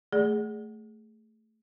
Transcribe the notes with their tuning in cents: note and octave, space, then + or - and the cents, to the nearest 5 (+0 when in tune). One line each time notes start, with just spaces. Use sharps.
A3 +0 G#4 +0 D5 -5